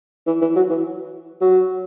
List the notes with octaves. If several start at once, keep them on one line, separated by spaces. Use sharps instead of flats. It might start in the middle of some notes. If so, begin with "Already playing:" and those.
E3
E3
F#3
E3
F#3